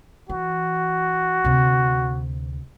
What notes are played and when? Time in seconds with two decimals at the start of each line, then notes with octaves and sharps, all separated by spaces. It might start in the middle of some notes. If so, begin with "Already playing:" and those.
0.29 E3 F#4
1.44 D2 C3